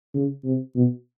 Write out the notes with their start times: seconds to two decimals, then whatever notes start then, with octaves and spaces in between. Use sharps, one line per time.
0.14 C#3
0.44 C3
0.76 B2